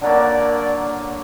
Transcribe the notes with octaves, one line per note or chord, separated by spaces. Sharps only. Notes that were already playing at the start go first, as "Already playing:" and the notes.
D3 F#3 A#3 D5